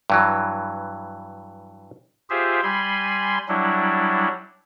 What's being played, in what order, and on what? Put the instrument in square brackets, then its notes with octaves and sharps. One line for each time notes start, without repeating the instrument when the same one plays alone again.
[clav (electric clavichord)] G2 E3 F#3
[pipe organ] F4 G4 G#4 C5 E5
G3 G#5 B5 C6
F#3 G3 D4 E4